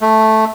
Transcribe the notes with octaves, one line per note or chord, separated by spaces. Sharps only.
A3